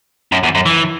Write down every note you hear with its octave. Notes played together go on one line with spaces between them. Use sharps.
F#2
E2
F#2
E3